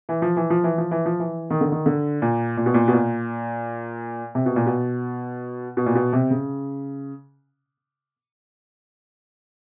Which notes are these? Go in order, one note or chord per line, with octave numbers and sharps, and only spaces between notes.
E3
F3
E3
F3
E3
F3
E3
F3
E3
D#3
D3
D#3
D3
A#2
A#2
B2
A#2
B2
A#2
C3
B2
A#2
B2
B2
A#2
B2
C3
C#3